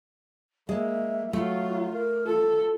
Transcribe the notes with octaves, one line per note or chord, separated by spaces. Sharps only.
G#3 A#3 E5
F#3 A3 F4
A#4
F4 A4